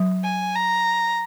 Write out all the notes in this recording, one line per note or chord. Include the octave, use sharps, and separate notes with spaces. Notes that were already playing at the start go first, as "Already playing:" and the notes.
Already playing: F#3
G#5
A#5